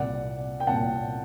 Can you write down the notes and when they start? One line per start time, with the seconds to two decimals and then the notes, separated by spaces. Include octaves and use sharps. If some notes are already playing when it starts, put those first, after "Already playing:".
Already playing: C2 A#2 D5 F#5
0.60 G5
0.67 C2 A#2 F#5 A5